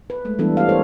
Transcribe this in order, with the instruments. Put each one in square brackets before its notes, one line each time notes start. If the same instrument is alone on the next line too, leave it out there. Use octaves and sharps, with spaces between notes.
[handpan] B4
G#3 A3
E3 G3 B3 D4 A4
G4 F5
G4 A4 A#4 C5 C#5